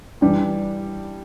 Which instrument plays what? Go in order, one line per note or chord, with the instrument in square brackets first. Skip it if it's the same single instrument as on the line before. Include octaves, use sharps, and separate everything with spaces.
[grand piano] E3 G3 D4 G4